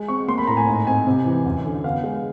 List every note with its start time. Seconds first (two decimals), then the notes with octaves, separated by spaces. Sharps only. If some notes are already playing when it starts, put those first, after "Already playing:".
Already playing: G#3
0.08 C4 C#6
0.28 A#3 C6
0.38 B5
0.47 A2 A#5
0.57 G#5
0.67 G#2
0.87 C4 G#5
1.07 C3
1.26 E3
1.45 F#2
1.65 D3
1.84 B3 F5
2.04 G#3